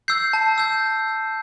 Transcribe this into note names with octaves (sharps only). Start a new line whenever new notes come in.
E6 G6 C7
A5
E6 G6